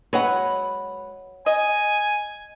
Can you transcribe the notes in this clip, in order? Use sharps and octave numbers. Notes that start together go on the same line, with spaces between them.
F#3 G#3 B4 C#5 F#5
D#5 G#5